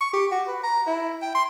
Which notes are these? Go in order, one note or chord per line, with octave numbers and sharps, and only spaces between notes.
C#6
G4
F#4
B4
A#5
E4
G5
C6